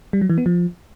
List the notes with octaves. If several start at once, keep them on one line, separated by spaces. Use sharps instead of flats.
G3
F#3
E3
B3
F3